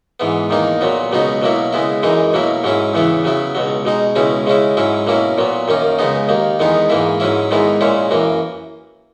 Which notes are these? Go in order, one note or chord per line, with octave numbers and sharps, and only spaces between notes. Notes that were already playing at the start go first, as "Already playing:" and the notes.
G#2 E3 B3
E2 D#3 A#3 D#4
A#2 F#3 B3
C#2 B2 F#3 B3 D#4
B2 F#3 A#3 E4
C#3 G#3 B3 E4
F#2 E3 G#3 D#4
B2 F#3 A#3 E4
G#2 F#3 C#4 E4
E2 C#3 E3 B3 E4
C#3 F#3 B3 E4
C#2 B2 F#3
B2 G#3 D#4
C#2 B2 G#3 C#4 E4
C#3 G#3 C#4 E4
G#2 F#3 C#4 E4
B2 A#3 C#4 E4
A#2 F#3 B3
F#2 D#3 A#3 C#4
C#2 C#3 G#3 B3 D#4
D#2 D#3 A#3
E2 D#3 G#3 B3 D#4
G#2 E3 A#3 E4
G#2 F#3 C#4 E4
G#2 D#3 G#3 B3 E4
A#2 G#3 C#4 E4
F#2 E3 A#3